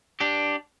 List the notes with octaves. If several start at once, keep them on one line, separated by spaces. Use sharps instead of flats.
D4 G4